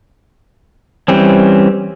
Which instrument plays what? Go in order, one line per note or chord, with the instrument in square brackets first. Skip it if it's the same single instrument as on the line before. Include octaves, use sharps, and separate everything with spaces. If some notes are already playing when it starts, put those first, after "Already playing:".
[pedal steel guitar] E3 G3 C4 C#4